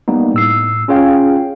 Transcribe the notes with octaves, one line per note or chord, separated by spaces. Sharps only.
G3 A#3 B3 D#4
A2 E6 C7
C#4 F4 G#4 C#5 F5 G5